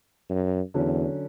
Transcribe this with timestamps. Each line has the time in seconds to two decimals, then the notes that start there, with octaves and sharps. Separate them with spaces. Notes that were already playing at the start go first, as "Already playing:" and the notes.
0.30 F#2
0.74 E2 D3 F#3 C#4